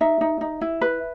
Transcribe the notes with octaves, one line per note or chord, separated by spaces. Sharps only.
D#4 E5
D#4
D#4
E4
B4